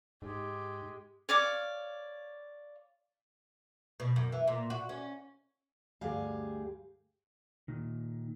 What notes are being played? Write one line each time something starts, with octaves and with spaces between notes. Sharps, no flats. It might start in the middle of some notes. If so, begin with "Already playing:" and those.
G#2 G#3 G4
C#5 D5 F5 D6
B2
F#2
E3
A#2
F#4
C#4
D2 G2 G4 G#4 F5
A#2 D#3